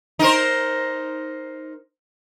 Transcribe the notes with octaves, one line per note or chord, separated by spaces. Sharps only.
D#4 A#4 C5